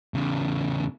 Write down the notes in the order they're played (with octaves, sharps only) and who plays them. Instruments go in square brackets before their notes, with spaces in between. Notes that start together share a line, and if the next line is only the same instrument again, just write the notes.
[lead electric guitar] E2 C#3